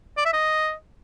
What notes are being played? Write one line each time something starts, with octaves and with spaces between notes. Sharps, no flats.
D5
E5
D#5